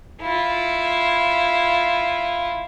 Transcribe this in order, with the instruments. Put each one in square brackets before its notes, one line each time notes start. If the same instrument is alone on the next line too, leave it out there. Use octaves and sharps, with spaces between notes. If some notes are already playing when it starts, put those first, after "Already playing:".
[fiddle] E4 F4